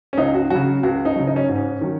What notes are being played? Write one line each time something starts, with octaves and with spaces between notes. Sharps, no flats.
C#4
C#2 D#4
F#4
C#3 F#3 F#4
C#2 F#4
D#4
C#3 F#3
D#4
C#4
G#2
C#4
D#3 F#3